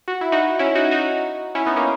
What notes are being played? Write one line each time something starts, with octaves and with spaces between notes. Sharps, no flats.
F#4
E4
D#4 F#4
C#4 E4
D#4 F#4
D#4 F#4
C#4 E4
B3 D#4
A#3 C#4